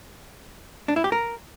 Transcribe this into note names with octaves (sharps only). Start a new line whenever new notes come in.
D4
E4
G4
A#4